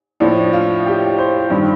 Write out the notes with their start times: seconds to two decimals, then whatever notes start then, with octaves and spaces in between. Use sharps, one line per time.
0.20 A2 F3 D4
0.53 F4
0.86 G4
1.18 C5
1.50 G2 D#3 D4